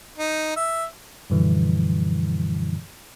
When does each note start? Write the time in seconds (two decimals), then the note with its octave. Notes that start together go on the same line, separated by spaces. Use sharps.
0.18 D#4
0.56 E5
1.30 F#2 A#2 D3 E3 F3 G3